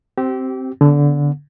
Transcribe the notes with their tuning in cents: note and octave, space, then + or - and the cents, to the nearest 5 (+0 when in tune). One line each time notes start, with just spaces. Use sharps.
C4 +0 G4 -30
D3 -20 B3 +0